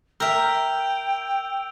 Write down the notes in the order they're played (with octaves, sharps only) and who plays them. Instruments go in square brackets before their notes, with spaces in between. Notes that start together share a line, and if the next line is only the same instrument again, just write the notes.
[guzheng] A#4 E5 [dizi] G5 [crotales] E6 G6 F7